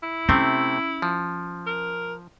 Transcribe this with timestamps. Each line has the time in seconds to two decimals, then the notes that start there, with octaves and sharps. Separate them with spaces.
0.03 E4
0.29 C3 A3 C4 C#4
1.02 F3
1.67 A#4